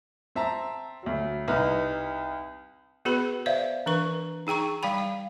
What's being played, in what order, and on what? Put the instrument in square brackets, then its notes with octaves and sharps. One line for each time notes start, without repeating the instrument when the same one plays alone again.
[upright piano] C4 E5 A5 A#5
D2 F#3
C2 D#4 B4 F6
[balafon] B3 F#4 G#4 B4 B5
C5 D5 E5 F5
E3 D4 B4 C#6
D#4 G#4 G5 A#5 C#6
G3 F5 G5 B5
F5